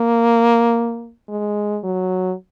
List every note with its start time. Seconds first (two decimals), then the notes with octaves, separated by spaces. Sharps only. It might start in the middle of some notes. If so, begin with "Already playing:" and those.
Already playing: A#3
1.28 G#3
1.83 F#3